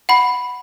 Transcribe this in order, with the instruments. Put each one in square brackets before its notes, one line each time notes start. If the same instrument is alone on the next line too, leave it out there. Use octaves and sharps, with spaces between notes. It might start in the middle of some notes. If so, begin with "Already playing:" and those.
[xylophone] F#5 B5